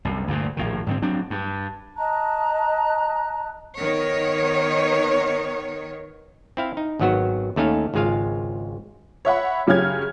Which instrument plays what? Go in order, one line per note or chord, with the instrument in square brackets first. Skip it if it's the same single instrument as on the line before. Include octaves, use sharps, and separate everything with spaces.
[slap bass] C2 F#2
D2 G2 A#2
A#1 A2 D#3
G#2 D3 C4
F#3 C4 D4
G2
[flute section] D#5 A5 A#5 F#6
[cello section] D#3 B3 C#5
[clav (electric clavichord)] C4 E4 F5
D#4
G#1 D#3 F#3 B3 F#4
D#2 A3 C#4 D#4 F5
G#1 C#2 G#3 F4 F5
[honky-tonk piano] C#5 E5 F#5 B5
F#2 C#3 C#4 G4 F6 G#6